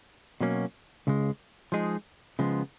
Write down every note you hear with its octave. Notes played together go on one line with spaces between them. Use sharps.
B2 F#3 A#3 C#4
C#2 C#3 G#3
F3 G#3 D#4 G#4
C#3 F3 G#3 B3